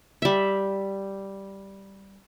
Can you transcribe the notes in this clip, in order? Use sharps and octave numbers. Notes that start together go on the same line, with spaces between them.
G3 E5